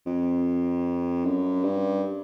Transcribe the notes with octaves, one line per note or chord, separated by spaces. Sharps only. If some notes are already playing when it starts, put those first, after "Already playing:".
F2
F#2
G2